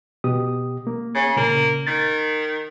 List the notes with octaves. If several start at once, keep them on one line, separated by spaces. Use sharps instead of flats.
B2 G4 D#6
A#3
C#3
A#2 C#3 A#3
D#3 A6